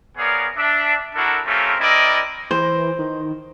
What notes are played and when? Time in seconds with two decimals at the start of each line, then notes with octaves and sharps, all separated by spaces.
0.18 B3 G#4 A#4 C#5 D5 F5
0.57 D4 E5
1.15 D4 E4 F#4 A4 A#4
1.46 A3 C4 C#4 F4 G4 A#4
1.79 C4 E4 A#4 D5 D#5
2.51 E3 C5
2.99 D#3